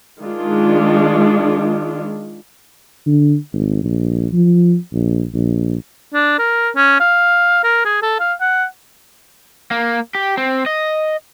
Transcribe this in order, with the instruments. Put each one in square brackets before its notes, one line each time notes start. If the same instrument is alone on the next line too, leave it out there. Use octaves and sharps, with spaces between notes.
[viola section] D#3 G#3 D4 F4
[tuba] D3
G#1
A#1
F3
A#1
A#1
[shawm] D4
A#4
C#4
F5
A#4
G#4
A4
F5
F#5
[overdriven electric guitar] A#3
G4
C4
D#5